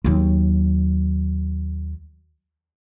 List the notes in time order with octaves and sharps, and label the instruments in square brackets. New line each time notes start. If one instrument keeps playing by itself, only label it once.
[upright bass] D#2 F#3